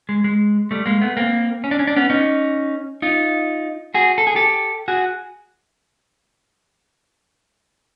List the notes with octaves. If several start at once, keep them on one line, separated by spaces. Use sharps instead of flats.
G#3
G#3
G3 A3
G#3 A#3
A3 B3
A#3 C4
C#4
D4
C#4
D4
B3 C#4
C#4 D#4
D#4 F4
F#4 G#4
A4
G#4
G4 A4
F#4 G#4